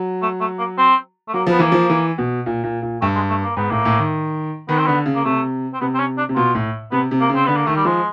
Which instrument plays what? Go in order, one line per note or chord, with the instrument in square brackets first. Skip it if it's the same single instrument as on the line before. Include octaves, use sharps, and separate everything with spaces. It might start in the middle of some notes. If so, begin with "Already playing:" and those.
Already playing: [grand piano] F#3
[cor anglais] A3
A3
A#3
C4
A3
[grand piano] F#3 [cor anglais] A#3
[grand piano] F3 [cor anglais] B3
[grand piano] E3 [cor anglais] A#3
[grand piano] F3
E3
B2
A#2
A#2
A#2
[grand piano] G2 [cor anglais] A3
[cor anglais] G#3
A3
A#3
[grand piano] G#2 [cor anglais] B3
[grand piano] A2 [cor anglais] A#3
[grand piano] A2
D#3
[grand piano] D#3 [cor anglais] B3
[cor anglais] C4
[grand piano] D3 [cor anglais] B3
[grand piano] C#3
[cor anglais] A#3
[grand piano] C3 [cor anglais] A3
[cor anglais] C4
[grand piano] C3 [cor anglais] B3
[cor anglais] C4
C#4
D4
[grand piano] C3
[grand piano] B2 [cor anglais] F4
[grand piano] A2
[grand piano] C3 [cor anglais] B3
[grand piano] C3
[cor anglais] A#3
[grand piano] C#3
[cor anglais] C4
[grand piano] D3 [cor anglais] B3
[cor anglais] A#3
[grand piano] D#3 [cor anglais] A3
[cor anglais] G3
[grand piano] F3 [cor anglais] G#3